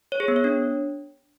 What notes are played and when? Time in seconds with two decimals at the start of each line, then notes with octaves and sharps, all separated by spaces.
0.12 C#5
0.20 G#4
0.28 B3
0.36 C#5
0.44 D4